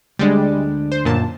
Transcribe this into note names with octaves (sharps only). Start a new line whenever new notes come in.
D2 G3 G#3 D4
C5
F#2 A#2 A5